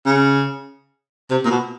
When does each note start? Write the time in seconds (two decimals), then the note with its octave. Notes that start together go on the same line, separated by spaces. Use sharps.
0.06 C#3
1.30 C3
1.45 A#2
1.51 B2